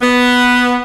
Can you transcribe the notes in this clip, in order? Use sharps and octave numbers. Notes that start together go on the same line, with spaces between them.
B3